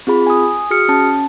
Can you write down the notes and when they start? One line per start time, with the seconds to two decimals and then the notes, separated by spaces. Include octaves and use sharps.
0.07 C4 F4 G#4 B5
0.27 G#5 D#6
0.71 F#4 G#4 D#6 F6 C#7
0.89 C#4 A5